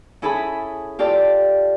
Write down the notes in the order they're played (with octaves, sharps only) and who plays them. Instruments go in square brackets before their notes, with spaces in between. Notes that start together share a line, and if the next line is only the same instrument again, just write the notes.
[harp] C#4 E4 G#4 A4 G#5 B5
F4 G4 A4 D5